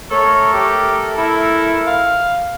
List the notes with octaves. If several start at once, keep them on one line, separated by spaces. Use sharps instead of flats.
A3 A4 A#4 C#5
G4
E4
F5